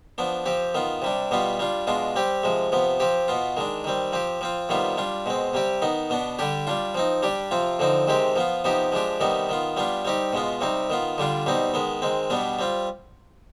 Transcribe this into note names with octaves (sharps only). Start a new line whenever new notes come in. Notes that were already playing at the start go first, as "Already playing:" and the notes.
F3 B3 D4
F3 C4 G4
D#3 B3 F4
C3 G3 D4
B2 G3 B3 F4
G3 D4 F4
B2 G#3 D4 F4
G3 C4 G4
C3 F3 G#3
C3 F3 B3
F3 C4 G4
B2 B3 F4
D#3 G#3 D4
D#3 G3 C4
F3 C4 G4
F3 C4 F4
C3 D#3 G3 B3 F4
G3 D4 F4
B2 G#3 C4
C3 G3 C4 G4
D#3 B3 D#4
B2 B3 D4
D3 G3 D4 G4
G3 D4 F4
F3 C4 D#4
G3 D4 G4
C3 F3 C4 F4
D3 F3 C4 D#4
C3 D#3 G#3 C4 G4
F3 B3 F4
C3 F3 B3 D#4 G4
F3 G#3 D4 G4
C3 D#3 G3 B3 D#4
D#3 B3 F4
G3 B3 D4 F4
G3 C4 D#4 G4
B2 G#3 B3 F4
C3 G3 C4 D#4
D#3 B3 F4
D3 G3 D4 F4
B2 G3 C4 D#4
D#3 G#3 B3
D#3 G#3 C4
B2 G3 B3 D4
G3 C4 F4